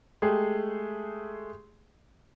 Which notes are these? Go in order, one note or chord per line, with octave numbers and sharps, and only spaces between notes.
G#3 A3 G4 G#4